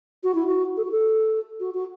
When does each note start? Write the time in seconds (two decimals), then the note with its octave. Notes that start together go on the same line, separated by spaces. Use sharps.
0.23 F#4
0.35 E4
0.46 F#4
0.77 A4
0.84 F#4
0.91 A4
1.60 F#4
1.74 F#4